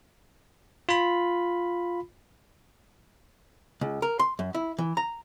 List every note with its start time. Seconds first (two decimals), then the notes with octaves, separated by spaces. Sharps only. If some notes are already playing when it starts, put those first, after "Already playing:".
0.89 F4 B5
3.81 C#2
4.02 A#4
4.19 C6
4.39 F#2
4.54 E4
4.78 E3
4.97 A#5